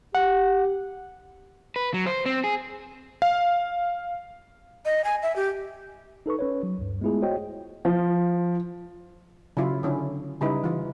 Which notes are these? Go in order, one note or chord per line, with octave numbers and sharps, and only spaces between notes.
G4 F#5
B4
F#3
C5
C4
G#4
F5
D#5
G#5
E5
G4
D#4 A4 B4 C#6
C#4 B4 C#5
F#3
D2 G2
G#3 A3 B3 E4 F4 G#4
F#4 C5 C#5 D#5 G5
F3
C#3 F#3 E4 F4
D3 C#4 E4
C#3 G3 D#4 E4 B4
E3 F4